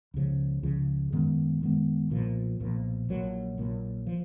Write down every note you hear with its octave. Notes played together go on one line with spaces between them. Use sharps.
C#2 C#3 F3
C#2 C#3 F3
F#2 D#3 G#3 B3
F#2 D#3 G#3 B3
B1 A#2 F3
B1 A#2 F3
A#1 A#2 F#3
A#1 A#2 F#3
F3